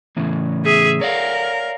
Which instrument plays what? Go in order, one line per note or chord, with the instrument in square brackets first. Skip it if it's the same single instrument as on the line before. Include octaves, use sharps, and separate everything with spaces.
[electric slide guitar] A2 C#3 E3
[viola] G#4 E5
[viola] A#4 [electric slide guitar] C#5 D5 F5